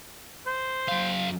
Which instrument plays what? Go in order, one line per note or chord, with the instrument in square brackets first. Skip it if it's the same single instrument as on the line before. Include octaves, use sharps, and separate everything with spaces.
[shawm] C5
[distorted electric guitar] F#2 F5